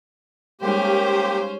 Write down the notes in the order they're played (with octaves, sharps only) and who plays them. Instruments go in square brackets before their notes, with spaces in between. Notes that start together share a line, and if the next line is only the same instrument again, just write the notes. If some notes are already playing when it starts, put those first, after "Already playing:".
[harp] G3 G#3 D#4 [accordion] A#3 G4 [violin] C#4 C5